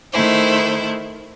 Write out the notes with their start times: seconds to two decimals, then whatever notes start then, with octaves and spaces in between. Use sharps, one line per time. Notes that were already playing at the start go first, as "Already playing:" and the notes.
0.11 D#3 A3 E4 C5